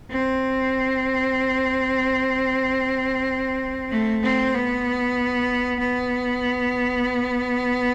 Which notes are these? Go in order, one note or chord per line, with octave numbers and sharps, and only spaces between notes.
C4
A3
C4
B3
B3